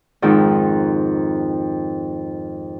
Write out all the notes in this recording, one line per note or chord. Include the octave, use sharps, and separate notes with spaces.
F2 G#2 D#3